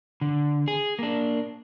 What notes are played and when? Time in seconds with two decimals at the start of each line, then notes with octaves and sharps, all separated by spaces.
0.21 D3
0.68 G#4
0.99 A#3 D4